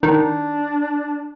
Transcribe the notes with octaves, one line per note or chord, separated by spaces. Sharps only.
D#3 D4